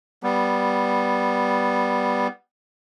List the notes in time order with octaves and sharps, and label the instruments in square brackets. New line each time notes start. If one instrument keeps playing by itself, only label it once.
[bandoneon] G3 B3